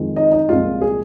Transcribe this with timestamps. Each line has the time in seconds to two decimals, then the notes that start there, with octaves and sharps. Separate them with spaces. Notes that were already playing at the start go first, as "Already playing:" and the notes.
Already playing: F2 D#3 G#3
0.16 D#4 D#5
0.32 D#4 D#5
0.49 C2 A#2 F3 G#3 F4
0.81 G#4